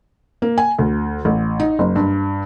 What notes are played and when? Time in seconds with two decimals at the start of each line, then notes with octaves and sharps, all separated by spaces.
0.42 A#3
0.58 G#5
0.79 D2
1.25 A1
1.60 D#4
1.79 F#1
1.96 G2